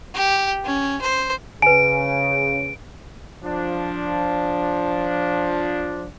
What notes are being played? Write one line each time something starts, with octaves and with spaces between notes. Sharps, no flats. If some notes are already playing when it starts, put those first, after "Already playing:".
G4
C#4
C5
C#3 B4 G#5 D7
F3 D4